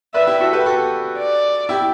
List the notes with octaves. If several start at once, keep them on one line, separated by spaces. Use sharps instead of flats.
B4 D5 E5
E4 G4
F#4 A4
G4 B4
F#4 A4
D5
E4 G4